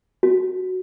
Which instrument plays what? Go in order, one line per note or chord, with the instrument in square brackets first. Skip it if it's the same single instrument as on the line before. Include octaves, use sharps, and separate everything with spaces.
[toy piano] F#4